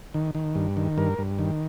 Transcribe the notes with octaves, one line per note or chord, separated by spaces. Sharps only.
D#3
D#3
G2
D#3
G2 A#4
G2
D#3